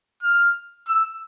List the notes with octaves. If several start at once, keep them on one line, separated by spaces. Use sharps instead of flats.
F6
E6